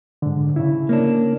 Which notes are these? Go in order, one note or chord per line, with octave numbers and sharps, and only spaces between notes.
G#2 D3
C#3 E4
A#3 C#4 D4